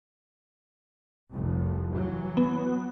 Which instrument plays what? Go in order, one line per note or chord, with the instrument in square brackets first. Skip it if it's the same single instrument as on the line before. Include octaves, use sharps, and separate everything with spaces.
[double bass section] F1 C2
E3 F#3
[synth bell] B3